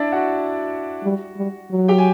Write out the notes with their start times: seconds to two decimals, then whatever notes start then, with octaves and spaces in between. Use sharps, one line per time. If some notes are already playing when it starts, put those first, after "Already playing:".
Already playing: D4 E4 D5 E5
0.12 F#4 F#5
1.03 G3
1.37 G3
1.71 F#3
1.88 G4 G5
1.98 G#5